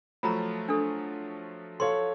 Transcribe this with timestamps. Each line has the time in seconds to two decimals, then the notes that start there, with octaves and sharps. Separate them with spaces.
0.23 F3 F#3 A3 A#5 B5
0.68 D4 A4
1.80 A4 C#5 F5 C6